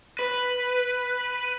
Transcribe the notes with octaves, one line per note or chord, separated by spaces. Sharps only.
B4